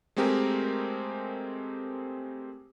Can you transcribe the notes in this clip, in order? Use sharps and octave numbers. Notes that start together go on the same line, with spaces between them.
G#3 A3 C4 G4 G#4 A#4